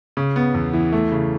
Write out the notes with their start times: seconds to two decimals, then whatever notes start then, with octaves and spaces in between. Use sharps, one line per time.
0.17 C#3
0.36 B3
0.54 E2
0.73 E3
0.93 A3
1.12 C#3